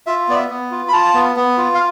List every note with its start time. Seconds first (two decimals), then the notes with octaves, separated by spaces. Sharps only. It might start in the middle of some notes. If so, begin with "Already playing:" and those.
0.06 F4 E5
0.28 B3 D5
0.35 E5
0.50 B3
0.71 F4
0.88 B5
0.93 F4 A5
1.14 B3
1.36 B3
1.57 F4
1.75 F5